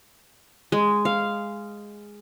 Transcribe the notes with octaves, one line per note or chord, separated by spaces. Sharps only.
G#3
F5